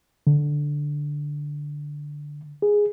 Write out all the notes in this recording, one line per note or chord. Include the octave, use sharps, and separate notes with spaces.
D3
G#4